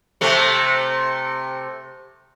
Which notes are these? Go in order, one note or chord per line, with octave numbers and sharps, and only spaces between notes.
C3 A3